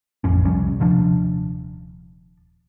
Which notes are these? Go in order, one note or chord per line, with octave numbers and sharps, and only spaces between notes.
A1 F2 C#4
C2 F2 G3 C#4
D#1 C3 F3 D4